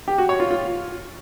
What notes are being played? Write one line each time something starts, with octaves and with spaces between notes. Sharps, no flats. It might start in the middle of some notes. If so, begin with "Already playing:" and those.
G4
F#4
C#5
F4
F4